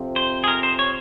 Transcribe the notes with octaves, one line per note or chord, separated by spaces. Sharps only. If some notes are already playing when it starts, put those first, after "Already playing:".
Already playing: F2 C3 F3 C4
C5
G#4
A#4
C5
C#5